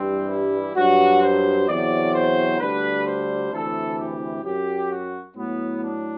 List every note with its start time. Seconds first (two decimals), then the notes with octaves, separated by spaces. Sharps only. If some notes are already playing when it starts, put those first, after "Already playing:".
Already playing: G2 E3 G3 C4
0.29 E4
0.76 G2 F#3 F#4
1.22 C5
1.68 E2 C3 F#3 D5
2.14 C5
2.60 D2 D3 G3 B4
3.06 C5
3.52 D2 C3 E3 A4
3.98 G4
4.44 F#2 F#3 G4
4.91 F#4
5.36 A2 F#3 B3
5.83 D4